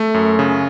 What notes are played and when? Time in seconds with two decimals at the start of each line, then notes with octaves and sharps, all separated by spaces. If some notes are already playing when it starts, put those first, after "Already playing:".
Already playing: A3
0.14 F#2
0.39 C#3